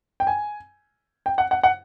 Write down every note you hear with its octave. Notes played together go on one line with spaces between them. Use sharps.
G5
G#5
G5
F#5
F#5
F#5